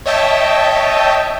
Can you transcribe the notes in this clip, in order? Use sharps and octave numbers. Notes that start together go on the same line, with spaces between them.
C#5 D#5 E5 G5 A5